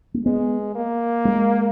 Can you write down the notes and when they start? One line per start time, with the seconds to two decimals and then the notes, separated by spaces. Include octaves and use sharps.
0.14 A#3
0.26 G#3 B3
0.75 A#3
1.25 G#3